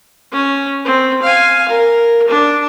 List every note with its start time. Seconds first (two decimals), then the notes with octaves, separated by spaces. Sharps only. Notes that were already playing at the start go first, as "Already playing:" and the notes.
0.32 C#4
0.85 C4
1.22 F5 G#5
1.69 A#4
2.29 D4